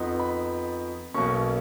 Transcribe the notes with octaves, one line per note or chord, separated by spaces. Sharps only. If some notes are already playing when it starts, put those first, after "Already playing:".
Already playing: F2 F3 B3 D#4
B5
B1 B2 A#3 C#4 C#6